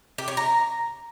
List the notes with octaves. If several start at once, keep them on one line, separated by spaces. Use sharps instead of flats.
G4
C#5
A#5